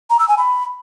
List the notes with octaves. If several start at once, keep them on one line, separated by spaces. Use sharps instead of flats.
A#5
E6
G#5
B5